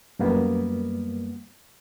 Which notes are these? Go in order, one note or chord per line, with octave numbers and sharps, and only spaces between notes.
F#2 G3 A#3 B3